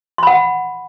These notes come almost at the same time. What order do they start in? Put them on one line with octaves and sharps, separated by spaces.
C6 B5 F#5